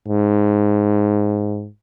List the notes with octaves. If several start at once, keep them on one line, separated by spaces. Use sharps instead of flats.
G#2